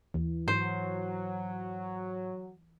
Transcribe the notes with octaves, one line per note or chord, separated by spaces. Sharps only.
D#2 E3
G#2 F#3 C5